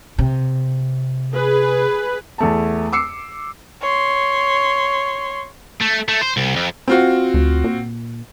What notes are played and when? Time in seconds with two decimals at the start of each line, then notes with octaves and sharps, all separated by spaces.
0.18 C3
1.35 G#4 B4
2.38 E2 A3 A5
2.93 D6 E6 C7 C#7
3.81 C#5 C6
5.81 A3
6.09 A3
6.21 C5
6.37 C2
6.56 F2
6.88 C4 F4 F#4
7.34 D2
7.64 A#2